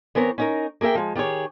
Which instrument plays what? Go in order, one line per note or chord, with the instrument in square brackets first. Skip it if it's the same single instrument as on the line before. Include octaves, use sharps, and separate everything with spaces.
[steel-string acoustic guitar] E3 B3 C4 A#4 C#5
C#4 D#4 A#4
A#3 G#4 A#4 E5 G5
F3 G#3
D#3 G4 G#4 C#5